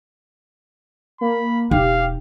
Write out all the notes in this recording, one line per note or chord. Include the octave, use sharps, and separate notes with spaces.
A#3 B5
E1 D#4 G4 F5